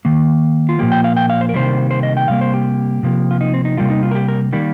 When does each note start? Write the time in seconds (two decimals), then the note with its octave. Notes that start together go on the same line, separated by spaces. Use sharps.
0.05 D#3 A#3
0.69 F4
0.79 A#2 F3 A#3 G4
0.92 G5
1.04 F5
1.16 G5
1.30 F5
1.41 C5
1.49 A#4
1.54 C3 D#3 G3 A#3 C5
1.91 C5
2.03 D#5
2.17 G5
2.28 C3 G3 A#3 F5
2.41 C5
2.54 G4
3.03 C3 F3 A#3
3.31 F4
3.41 D#4
3.54 C4
3.65 D#4
3.77 C3 G3 A#3 F4
3.90 D#4
4.03 F4
4.11 A#4
4.15 G4
4.28 A#4
4.53 D#3 G3 A#3